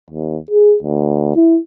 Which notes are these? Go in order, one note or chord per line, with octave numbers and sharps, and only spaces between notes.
D#2
G#4
D2
E4